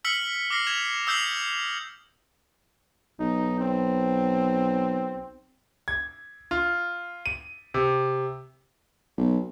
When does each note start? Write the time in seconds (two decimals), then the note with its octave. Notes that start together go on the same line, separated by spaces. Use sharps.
0.04 E6 F6 B6 C#7 F#7
0.50 D6 F6 A#6 C7
0.67 G#6 E7 F7
1.07 D#6 E6 G6 C7 F7 F#7
3.19 B1 D#4
3.60 C4
5.88 G#6
6.51 F4
7.26 D#7
7.74 C3
9.18 B1